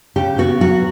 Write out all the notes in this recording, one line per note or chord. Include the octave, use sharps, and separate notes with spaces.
C#3 G4
B3 F#4
F#3 F#4